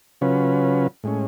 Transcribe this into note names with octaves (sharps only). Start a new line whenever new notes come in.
C#3 F#3 C#4 F4 B4
A2 G#3 C#4